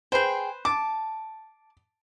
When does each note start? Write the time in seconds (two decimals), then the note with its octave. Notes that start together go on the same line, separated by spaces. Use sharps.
0.12 G#4 B4 C5 G5
0.65 A5 D6